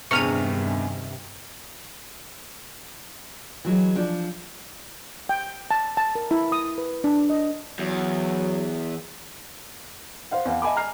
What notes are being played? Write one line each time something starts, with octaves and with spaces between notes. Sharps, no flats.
A#1 E2 G2 C3 D#3 C#6 F6 D#7
E3 F#3 G#3
F3 D4
G5
A5
A5
A#4
E4
D#6
B4
D4
D#5
E2 F#3
C5 F5 F#5
E2 B3 F5
D#5 E5 G#5 A5 B5 D6
G#5 A#5 F6 C7